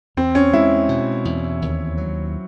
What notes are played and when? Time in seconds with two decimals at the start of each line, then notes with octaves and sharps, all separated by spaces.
0.17 E2 C4
0.35 C#4
0.53 G#3 E4
0.89 B2
1.25 E2
1.62 D#2
1.97 F#3